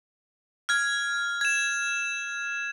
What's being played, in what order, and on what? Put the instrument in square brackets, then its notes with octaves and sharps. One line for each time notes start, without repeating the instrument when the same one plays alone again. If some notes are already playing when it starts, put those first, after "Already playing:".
[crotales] F6 G#6
G#6 E7